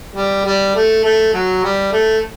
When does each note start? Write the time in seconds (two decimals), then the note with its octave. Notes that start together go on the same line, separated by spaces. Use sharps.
0.15 G3
0.45 G3
0.75 A3
1.04 A3
1.33 F#3
1.64 G3
1.92 A3